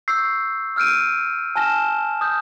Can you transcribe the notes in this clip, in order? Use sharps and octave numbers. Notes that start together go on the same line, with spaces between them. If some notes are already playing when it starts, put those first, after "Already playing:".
C#6 E6 G6 C7
E6 F6 G6 D7 D#7
G#5 A5 F6 A#6 E7
D#6 G6